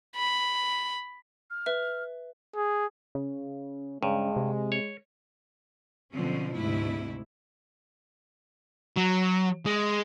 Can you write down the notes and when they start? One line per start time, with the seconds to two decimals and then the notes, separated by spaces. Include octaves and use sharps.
0.16 B5
1.50 F6
1.66 B4 E5
2.56 G#4
3.15 C#3
4.03 G2 C#3 G#3
4.36 C3
4.72 C#5
6.12 B2 D3 F3 F#3 C4 C#4
6.53 D2 G#2 C3 A3 E4
8.96 F#3
9.66 G#3